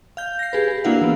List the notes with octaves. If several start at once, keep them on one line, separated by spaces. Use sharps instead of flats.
F5 G6
A#6 C7
G4 G#4 B4
G#4
A#3 D4 E4 F#4 F5 F#5
E3 B3